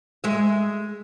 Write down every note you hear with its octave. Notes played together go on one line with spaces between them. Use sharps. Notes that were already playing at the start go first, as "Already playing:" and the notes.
G#3 E5